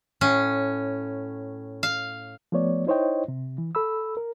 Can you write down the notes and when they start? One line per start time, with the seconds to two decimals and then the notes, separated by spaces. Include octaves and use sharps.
0.21 A2 C#4
1.83 F5
2.52 F3 A3 B3 C#5 D5
2.87 D#4 E4 C5 C#5 D#5 G5
3.28 C3
3.58 E3
3.75 A4 B5 E6
4.17 A#4